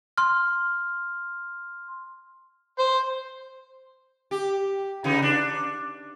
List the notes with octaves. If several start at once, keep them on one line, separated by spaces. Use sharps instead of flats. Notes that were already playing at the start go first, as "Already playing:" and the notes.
C6 F6
C5
G4
C#3 E3 D#4
D4